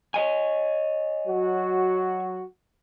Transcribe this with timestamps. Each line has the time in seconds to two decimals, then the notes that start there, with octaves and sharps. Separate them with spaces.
0.14 C#5 D#5 G#5
1.27 F#3 F#4